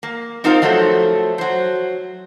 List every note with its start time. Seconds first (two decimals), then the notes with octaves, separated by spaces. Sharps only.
0.03 A#3
0.44 C4 D#4 F4 A#4 C5 F5
0.62 F3 F#3 A3 A4 C5
1.38 F#3 C5